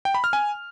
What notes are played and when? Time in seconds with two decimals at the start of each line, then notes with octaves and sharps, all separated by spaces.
0.05 G5
0.15 B5
0.24 F6
0.33 G#5